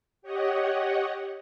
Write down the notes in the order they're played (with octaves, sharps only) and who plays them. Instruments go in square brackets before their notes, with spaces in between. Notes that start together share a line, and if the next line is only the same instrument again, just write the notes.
[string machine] G4 C#5 D#5 F#5